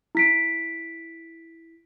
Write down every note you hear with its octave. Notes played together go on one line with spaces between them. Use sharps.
E4 B6 D7